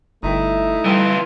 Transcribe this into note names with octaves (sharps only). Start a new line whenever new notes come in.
G1 A3 D#4 E4
E3 G3 F4